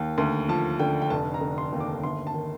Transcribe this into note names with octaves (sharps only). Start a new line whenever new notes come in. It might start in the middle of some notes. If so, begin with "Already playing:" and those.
Already playing: D#2
D2 C6
F3 A5
D3 G5
G5
F1 A5
A#5
D3
C6
D#2
D6
G1 C6
A5
D#3